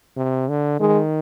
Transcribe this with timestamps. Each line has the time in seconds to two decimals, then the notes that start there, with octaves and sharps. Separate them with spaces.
0.17 C3
0.49 D3
0.80 D#3 G#3